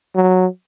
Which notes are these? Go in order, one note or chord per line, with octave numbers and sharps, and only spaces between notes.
F#3